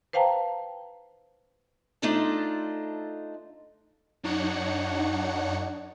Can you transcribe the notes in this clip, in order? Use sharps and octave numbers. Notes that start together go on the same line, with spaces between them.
B4 C5 F5 G5 A5 A#5
A3 D4 D#4 F4 A4 C5
F#2 D4 D#4 C#5 F#5 C#7